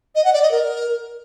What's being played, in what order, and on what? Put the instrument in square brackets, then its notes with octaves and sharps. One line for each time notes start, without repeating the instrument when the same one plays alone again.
[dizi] D#5
F#5
D5
D#5
A#4